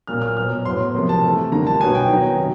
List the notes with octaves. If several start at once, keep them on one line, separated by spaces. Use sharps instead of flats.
A#2 F#3 A#3 F6
F6
B2 F#3 B3 F6
A2 F#3 B3 C6
C3 F3 A#3
A5
C3 E3 A3
D3 G3 A#3 A#5
A5
B2 F#3 B3 G#5
G5
D#3 F#3 B3
C3